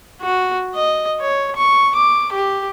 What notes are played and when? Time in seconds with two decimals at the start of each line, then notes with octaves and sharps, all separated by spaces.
0.21 F#4
0.75 D#5
1.20 C#5
1.56 C#6
1.95 D6
2.32 G4